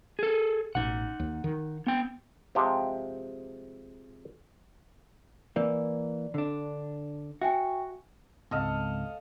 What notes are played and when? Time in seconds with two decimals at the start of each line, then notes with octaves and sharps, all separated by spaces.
0.19 G#4 A4
0.75 A1 B2 D#4 F#5
1.20 D#2
1.44 D#3
1.87 B3 G5
2.55 C3 F3 G#3 G4 C5 F5
5.56 E3 A#3 D5
6.34 D3 D4
7.41 F#4 E5 G5 G#5
8.51 C#2 G#2 C4 A4 D#5 F5